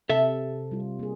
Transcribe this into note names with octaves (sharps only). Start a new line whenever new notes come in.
C3 A4 E5
G3 F4
A#3 G#4